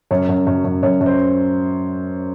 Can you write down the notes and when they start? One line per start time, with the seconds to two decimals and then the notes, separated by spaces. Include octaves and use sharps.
0.11 F#2 C#5
0.29 F#2
0.47 F#2
0.64 F#2
0.83 F#2 C#5
1.01 F#2
1.06 C5